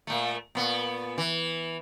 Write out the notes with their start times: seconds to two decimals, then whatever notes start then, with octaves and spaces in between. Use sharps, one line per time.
0.07 A#2 A3
0.55 A#2 B3
1.18 E3